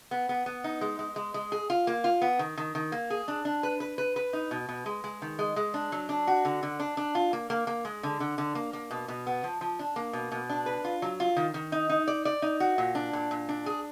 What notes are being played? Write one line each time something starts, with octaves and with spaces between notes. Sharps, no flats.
B3
B3
B3
D#4
G#3
G#3
G#3
G#3
G#4
F4
A#3
F4
B3
D#3
D#3
D#3
A#3
G#4
D4
D4
B4
B4
B4
B4
D#4
B2
B2
G#3
G#3
D#3
G#3
G#3
D4
F#3
D4
F#4
D3
D3
D4
D4
F4
A#3
A#3
A#3
G#3
D3
D3
D3
A#3
A#3
B2
B2
B3
F3
F3
D4
A#3
B2
B2
D4
B4
F4
F#3
F4
D#3
D#3
D#4
D#4
D5
D5
D#4
F#4
A#2
D4
A#2
A#2
D4
G#4